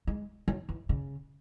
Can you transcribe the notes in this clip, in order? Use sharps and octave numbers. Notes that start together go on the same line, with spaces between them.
G#3
F#3
E3
C#3